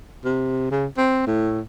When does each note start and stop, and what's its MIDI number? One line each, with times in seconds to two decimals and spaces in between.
0.25 0.70 48
0.71 0.87 49
0.97 1.26 60
1.27 1.60 45